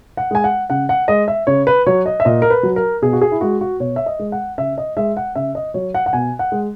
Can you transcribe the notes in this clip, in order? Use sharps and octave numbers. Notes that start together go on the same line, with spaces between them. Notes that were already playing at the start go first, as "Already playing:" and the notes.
F#5
G#3 G#5
F#5
C#3 F#5
F#5
G#3 D#5
E5
C#3 C#5
B4
F#3 C#5
D#5
E5
A#2 D#5
A#4
B4
F#3
A#4
B2 G#4
F#4
G#4
E4
G#3 F#4
F#4
B2 C#5
E5
D#5
G#3
F#5
C#3 E5
D#5
G#3 E5
F#5
C#3 E5
D#5
F#3 C#5
F#5
F#5
B2 G#5
F#5
G#3